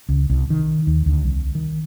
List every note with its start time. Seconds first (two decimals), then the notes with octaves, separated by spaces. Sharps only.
0.09 C#2
0.30 C2
0.50 D#3
0.87 D#2
1.06 D2
1.24 C2
1.55 D#3